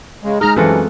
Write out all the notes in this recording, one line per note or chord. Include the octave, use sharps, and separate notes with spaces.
C#3 G#3
G#3 D#4 G#4 A#5 F6
F#2 C3 E3 A3 C4 F4 F#4 A4